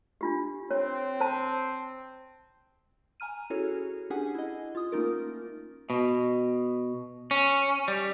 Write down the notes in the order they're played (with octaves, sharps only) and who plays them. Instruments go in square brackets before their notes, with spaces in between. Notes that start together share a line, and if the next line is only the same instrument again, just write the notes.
[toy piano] D4 F4 G4
[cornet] C4 [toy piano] C#5
[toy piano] C5 A5
[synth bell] G#5 A#5 F6 D#7
C#4 E4 F#4 G#4 A4 C#5
C#4 D4 G4 G#4 F#5 G#5
E4 D#5
F4 D#6
A3 A#3 C#4 D#4 F4 A#4
[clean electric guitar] B2
C#4
G3